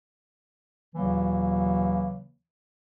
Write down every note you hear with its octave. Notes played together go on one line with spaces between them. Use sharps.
D#2 A#2 C#3 E3 F#3 A#3